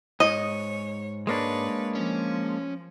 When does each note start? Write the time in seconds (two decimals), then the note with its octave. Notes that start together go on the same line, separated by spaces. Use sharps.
0.20 D2 G#2 C#5 D#5
1.27 G#3 A#3 D4 B4 C#5
1.95 F3 C#4